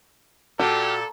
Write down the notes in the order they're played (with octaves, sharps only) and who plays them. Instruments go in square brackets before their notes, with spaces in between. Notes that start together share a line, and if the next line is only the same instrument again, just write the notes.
[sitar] A#2 [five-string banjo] F#4 [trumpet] G4 [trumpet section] A4